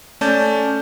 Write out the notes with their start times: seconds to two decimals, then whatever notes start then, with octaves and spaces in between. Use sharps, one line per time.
0.21 A3 C#4 D5 A5 D6 G6